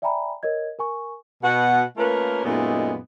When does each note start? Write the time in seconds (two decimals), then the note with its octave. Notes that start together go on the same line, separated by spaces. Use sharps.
0.02 D5 E5 G5 G#5 A#5 B5
0.43 A#4 C#5 D#5 G#6
0.79 A#4 G#5 C#6
1.42 B2 F#5
1.97 A3 A#3 C#4 F4 A#4 B4
2.44 F#2 A#2 G#3 A3 B3 D#4